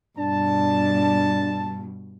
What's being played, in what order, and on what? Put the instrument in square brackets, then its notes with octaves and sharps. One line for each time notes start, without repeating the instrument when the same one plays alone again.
[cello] G2 B2 [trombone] D4 [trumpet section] A5